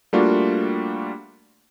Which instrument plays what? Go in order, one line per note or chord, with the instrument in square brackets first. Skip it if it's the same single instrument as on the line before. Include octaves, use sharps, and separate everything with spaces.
[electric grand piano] G3 A3 A#3 D4 F4 F#4